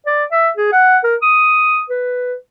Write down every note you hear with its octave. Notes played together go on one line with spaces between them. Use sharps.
D5
E5
G#4
F#5
A#4
D#6
B4